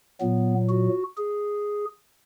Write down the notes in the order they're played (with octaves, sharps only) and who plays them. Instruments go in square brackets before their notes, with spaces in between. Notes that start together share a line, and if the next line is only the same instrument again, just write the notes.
[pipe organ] A#2 F#3 B3
F#4
G#4